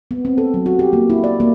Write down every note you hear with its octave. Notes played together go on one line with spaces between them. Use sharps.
B3
C4
A4
F#3
F#4
G4
A#3
E4
D5
A#3